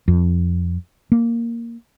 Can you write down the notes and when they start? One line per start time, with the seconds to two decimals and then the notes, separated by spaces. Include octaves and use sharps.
0.08 F2
1.12 A#3